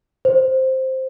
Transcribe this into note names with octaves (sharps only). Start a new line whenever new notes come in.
C5